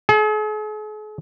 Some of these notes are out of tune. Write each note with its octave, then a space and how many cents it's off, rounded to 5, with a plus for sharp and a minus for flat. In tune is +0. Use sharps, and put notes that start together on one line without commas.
G#4 +45